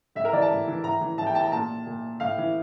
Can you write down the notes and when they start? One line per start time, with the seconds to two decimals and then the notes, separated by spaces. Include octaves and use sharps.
0.15 A2 E5
0.25 A#4
0.33 E3 D5
0.42 A5
0.49 A2
0.67 E3
0.84 A2 A#5
1.01 E3
1.18 A2 A5
1.27 G5
1.35 E3 A5
1.44 A#5
1.52 A#2 A5
1.86 A#2
2.20 A2 F5
2.38 E3